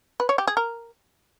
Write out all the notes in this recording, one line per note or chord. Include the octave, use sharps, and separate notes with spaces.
B4
C#5
G4
G#4
A#4